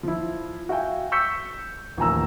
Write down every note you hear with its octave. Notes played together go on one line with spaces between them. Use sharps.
F3 E4
F#4 E5 F5 G5 G#5
C#6 E6 G6 B6 C#7
A1 D#2 F3 G#5 A#5 E6